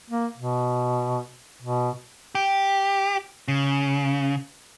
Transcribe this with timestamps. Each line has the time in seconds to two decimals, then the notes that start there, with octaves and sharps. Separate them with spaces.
0.10 A#3
0.38 B2
1.62 B2
2.35 G4
3.48 C#3